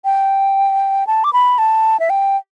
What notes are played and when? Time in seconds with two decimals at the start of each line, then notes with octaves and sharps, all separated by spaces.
0.05 G5
1.07 A5
1.24 D6
1.33 B5
1.58 A5
2.00 E5
2.10 G5